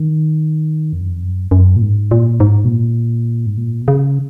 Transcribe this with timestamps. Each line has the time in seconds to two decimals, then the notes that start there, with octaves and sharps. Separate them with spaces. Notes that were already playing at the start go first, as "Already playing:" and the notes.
Already playing: D#3
0.93 F2
1.01 F#2
1.10 F2
1.23 F#2
1.51 F#2
1.76 A#2
1.82 G#2
2.11 A#2
2.40 G#2
2.65 B2
2.69 A#2
3.46 G#2
3.57 A#2
3.82 B2
3.88 C#3